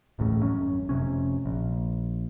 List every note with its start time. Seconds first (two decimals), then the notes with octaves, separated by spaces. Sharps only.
0.19 D1 A1 A2 C#3
0.43 G#1 F#2 C#4
0.89 F1 C2 C3 C#4
1.46 A#1